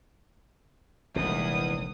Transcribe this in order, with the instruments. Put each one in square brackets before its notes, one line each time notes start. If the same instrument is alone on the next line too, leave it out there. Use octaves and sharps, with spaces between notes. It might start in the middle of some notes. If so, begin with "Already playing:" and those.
[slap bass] F1 A#1 D#3 [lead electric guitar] E2 [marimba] C3 G3 G#3 [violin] D#6